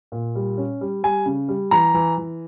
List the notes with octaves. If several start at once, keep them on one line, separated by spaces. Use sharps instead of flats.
A#2
G3
C#4
G3
G3 G#5
C#3
G3
E3 A#5
E3
E3